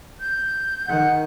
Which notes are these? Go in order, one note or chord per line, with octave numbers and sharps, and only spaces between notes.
G6
D#3 F#5